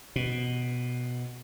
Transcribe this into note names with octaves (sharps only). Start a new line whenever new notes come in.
B2